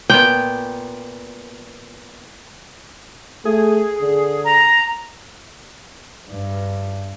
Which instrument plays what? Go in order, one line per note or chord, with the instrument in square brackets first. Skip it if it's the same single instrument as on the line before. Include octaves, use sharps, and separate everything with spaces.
[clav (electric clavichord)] A#2 B3 [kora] G5
[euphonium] A3 [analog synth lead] G#4
[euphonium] D3
[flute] A#5
[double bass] G2